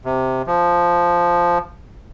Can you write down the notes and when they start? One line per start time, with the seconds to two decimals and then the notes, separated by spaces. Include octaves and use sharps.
0.05 C3
0.47 F3